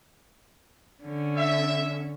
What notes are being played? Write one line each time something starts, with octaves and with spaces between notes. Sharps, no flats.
D3 C#4
E5